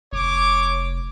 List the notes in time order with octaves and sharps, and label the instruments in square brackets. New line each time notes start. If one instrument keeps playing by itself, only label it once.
[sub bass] F1 [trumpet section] C#5 D6